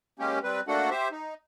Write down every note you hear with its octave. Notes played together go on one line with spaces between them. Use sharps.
G#3 A#3 C#4 G4
G3 C4 B4
A3 A#3 D4 F#4 A4 F#5
G4 C5 E5
D#4